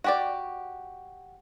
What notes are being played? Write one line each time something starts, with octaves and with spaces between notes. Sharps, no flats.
F#4 G4 D5